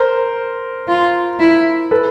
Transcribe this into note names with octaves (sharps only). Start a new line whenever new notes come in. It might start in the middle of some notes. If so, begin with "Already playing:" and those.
Already playing: A#4 C5
F4
E4
A4 B4